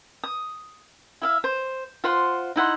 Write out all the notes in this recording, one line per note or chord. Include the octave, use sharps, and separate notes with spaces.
D#6
E4 E5 F5
C5
F4 C5 F#5 C6
D#4 E4 F#5 C6